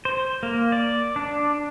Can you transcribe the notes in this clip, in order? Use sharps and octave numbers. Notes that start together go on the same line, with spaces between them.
C5
A#3
D5
D4